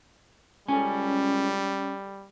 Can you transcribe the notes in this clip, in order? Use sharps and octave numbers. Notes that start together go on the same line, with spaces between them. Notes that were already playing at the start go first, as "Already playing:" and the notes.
C#2 G3 C#4 A4 G#5